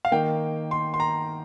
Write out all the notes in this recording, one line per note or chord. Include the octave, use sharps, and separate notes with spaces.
F5
D#3 A#3 G5
C6
C6
A#5